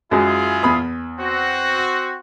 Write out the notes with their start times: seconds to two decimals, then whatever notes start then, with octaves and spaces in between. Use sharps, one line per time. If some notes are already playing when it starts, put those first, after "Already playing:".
0.11 F#2 F#3 G#3 E4 F4 G#4
0.63 E2 B5 D#6
1.19 C4 F#4